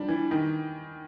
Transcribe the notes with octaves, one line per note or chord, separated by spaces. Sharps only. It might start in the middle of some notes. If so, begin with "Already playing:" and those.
Already playing: F3 G3 D4
E3
D#3